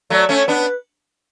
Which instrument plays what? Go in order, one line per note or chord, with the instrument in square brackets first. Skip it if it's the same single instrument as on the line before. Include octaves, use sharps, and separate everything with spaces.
[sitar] F#3 A3 [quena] D5
[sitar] A3 C#4 [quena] C#5
[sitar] B3 D4 [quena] B4